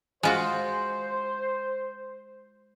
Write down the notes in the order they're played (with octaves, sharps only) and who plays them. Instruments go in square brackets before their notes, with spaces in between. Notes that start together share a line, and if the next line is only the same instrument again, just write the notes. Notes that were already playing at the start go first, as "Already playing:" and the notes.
[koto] G#3 F4 F#4 [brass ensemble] C5